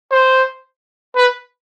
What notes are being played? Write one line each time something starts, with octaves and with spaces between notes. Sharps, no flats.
C5
B4